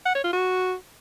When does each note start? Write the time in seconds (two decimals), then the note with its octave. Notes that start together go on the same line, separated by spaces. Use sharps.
0.06 F#5
0.15 C#5
0.24 F4
0.33 F#4